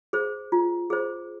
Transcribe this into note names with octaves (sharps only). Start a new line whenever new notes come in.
G#4 C5
F4
G#4 C5